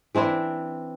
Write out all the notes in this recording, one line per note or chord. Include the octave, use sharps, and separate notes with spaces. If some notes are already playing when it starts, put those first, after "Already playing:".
E3 C4 D4 E4